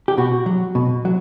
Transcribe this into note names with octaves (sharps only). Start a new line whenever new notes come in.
G4
B2 F#4
F#3
B2
F#3